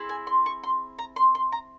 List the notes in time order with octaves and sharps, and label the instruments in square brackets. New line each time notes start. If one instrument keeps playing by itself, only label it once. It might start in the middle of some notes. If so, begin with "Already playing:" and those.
Already playing: [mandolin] C4 E4 G#4
G#5
C6
C#6
C6
A#5
C6
C6
A#5